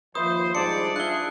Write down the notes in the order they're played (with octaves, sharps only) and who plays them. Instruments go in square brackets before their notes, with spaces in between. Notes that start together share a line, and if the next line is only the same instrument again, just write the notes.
[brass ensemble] D#2 F3 [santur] B4 E5 [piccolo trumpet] C5 [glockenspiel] D#6
[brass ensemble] G#2 G3 [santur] D4 F4 G#5 [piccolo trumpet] D5 [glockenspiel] C#7
[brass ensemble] D4 [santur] F4 E5 [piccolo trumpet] G#4 [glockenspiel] F#6 G7